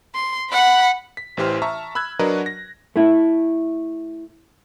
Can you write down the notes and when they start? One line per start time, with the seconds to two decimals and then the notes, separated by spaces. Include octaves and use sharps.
0.15 C6
0.50 F#5 B5
1.17 B6
1.37 A1 E3 G4 C5 F6
1.62 E5 A5 A#5 C#6
1.95 B5 E6 F#6 G#6
2.19 F#3 D4 F#4 A#4 B4 D#5
2.46 A#6
2.96 A3 E4